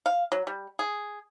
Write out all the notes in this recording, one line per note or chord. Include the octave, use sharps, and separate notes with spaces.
F5
F#3
G3
G#4